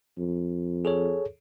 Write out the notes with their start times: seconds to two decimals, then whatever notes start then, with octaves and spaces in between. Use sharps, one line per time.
0.18 F2
0.85 G#4 A4 C#5